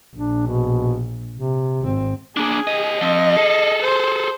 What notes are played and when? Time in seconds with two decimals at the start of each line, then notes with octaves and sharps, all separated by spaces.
0.16 A#1 D4
0.46 B2
1.34 C3
1.81 G#1 C4
2.37 A#3 D4 G#4
2.67 G4 D#5
3.01 F3 C4 D#5
3.37 G#4 A4
3.83 C5